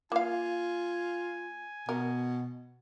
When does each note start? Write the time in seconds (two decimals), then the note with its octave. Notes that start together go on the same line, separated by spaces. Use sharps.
0.12 A#3 F4 F5 G#5
1.89 B2 A#4